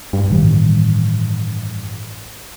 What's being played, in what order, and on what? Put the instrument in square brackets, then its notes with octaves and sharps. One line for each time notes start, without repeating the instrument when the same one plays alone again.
[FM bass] G2
[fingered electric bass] A1 D#3 G3